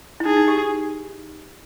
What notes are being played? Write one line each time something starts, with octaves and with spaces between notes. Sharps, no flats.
E4
D#4 G#4
D#4
G4